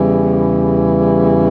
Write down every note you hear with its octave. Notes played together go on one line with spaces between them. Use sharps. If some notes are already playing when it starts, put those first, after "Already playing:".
Already playing: E2 C#3 E3 G3